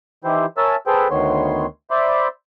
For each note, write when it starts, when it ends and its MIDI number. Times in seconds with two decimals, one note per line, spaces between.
0.24 0.46 51
0.24 0.46 52
0.24 0.46 64
0.24 0.46 67
0.24 0.46 72
0.57 0.76 70
0.57 0.76 73
0.57 0.76 76
0.57 0.76 80
0.57 0.76 81
0.57 0.76 88
0.87 1.08 68
0.87 1.08 69
0.87 1.08 71
0.87 1.08 72
0.87 1.08 79
1.11 1.66 38
1.11 1.66 51
1.11 1.66 59
1.11 1.66 73
1.11 1.66 84
1.91 2.28 72
1.91 2.28 74
1.91 2.28 76
1.91 2.28 83
1.91 2.28 84
1.91 2.28 86